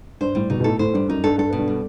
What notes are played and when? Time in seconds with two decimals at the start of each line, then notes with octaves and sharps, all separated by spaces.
0.21 G2 C5
0.35 A2 G3
0.50 B2 D#4
0.60 B2
0.64 A2 A4
0.79 A2 C5
0.94 G2 G3
1.08 F#2 D#4
1.24 G2 A4
1.38 G2 A4
1.53 B2
1.58 G2
1.68 G3